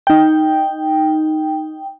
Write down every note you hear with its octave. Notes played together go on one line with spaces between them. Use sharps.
D#4 G5